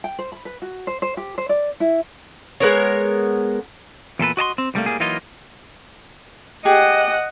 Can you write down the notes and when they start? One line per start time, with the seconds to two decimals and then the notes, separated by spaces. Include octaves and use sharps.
0.04 G5
0.19 C5
0.32 B5
0.45 B4
0.62 F#4
0.87 C5
1.02 C5
1.17 G4
1.38 C5
1.49 D5
1.80 E4
2.60 G#3 B3 A#4 C#5
4.19 E2 A#2 A4 B4
4.37 F#4 D#5 A5 C6
4.58 C4
4.74 C2 E3 G3 A3 A#3
4.86 A2 G3 A#3 G#4
5.00 E3 F#3 A#3 D#4 F4 D#5
6.65 G4 G#4 D#5 F#5